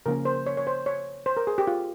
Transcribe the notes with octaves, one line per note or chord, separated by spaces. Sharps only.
C#3 F3 A#3 C#4 A#4
C5
C#5
C#5
C5
C#5
C5
A#4
G#4
G4
F4